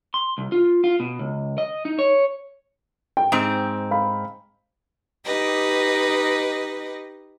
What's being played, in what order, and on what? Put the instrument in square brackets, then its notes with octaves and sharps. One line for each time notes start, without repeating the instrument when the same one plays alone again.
[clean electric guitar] C6
C2
F4
F4
B2
C#2
D#5
D#4
C#5
[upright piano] G5
[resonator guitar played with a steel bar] G#2 C4
[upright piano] F5 B5
[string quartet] D#4 G4 B4 D#5